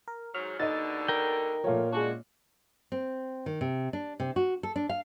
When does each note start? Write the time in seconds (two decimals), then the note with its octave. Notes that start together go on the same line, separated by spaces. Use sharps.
0.08 A#4
0.34 G#2 F#3 F6
0.60 D#2 B2 D3 D#4 D#5 A6
1.08 A#4 G5
1.64 A#2 F3 A3 F4 C#5
1.92 G#3 C#4 D4 F#4
2.92 C4
3.46 D#3
3.61 C3
3.93 D4
4.20 C3
4.36 F#4
4.63 A4
4.76 D4
4.89 F5